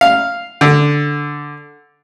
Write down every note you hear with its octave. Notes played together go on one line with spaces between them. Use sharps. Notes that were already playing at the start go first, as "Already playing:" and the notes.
F5
D3